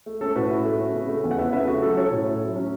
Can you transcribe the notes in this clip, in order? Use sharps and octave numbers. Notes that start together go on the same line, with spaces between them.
A3
C#4 A4
A2 F#4 B4
E4
A3
C#4
C#3
A3
E2
F#5
E4 B4 E5
C#3 B4 E5
A3 F#4
F#3 A4
C#4 A4 C#5
A2
E4
F#3
C#4